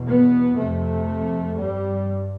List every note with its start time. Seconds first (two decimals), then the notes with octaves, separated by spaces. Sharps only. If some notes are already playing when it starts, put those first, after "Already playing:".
Already playing: E2 B2
0.08 B3
0.58 F2 C3 A3
1.58 G2 G3